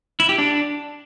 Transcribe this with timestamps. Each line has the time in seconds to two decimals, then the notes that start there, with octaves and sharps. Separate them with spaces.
0.20 E4
0.29 G4
0.38 D4